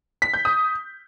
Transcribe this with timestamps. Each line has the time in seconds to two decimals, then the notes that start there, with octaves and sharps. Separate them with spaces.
0.22 B6
0.34 G6
0.45 D#6